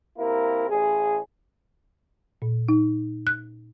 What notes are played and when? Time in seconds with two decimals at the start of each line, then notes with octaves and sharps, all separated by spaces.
0.18 C3 A#3 E4 A#4
0.70 A1 G#4
2.42 A#2
2.69 D#4
3.27 F#6